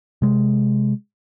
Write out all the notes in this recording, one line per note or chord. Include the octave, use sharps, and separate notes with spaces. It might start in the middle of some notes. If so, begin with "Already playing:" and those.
C3 G#3